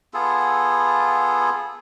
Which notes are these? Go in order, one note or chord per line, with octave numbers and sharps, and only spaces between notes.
B3 F4 G#4 A4